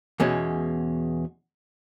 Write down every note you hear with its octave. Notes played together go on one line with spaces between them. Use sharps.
E2 B2 G#3 C#4